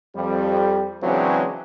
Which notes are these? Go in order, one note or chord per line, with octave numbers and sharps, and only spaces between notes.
F2 G3
C#3 E3 F#3 G#3 C4 D4